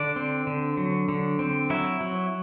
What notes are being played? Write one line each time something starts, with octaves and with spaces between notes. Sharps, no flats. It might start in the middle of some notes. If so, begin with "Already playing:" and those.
Already playing: D3 D4 D5
C4
D3
F#3
D3
C4
F#3 E4 E5
F#3